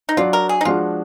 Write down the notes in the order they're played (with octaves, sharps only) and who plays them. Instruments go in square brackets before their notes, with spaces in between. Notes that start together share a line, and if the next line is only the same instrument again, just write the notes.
[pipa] D#4
[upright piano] F#3 D4 F#4 D5 [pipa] F4
[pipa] A#4
G#4
D#4
[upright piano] F3 G#3 D4 F#4 [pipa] F4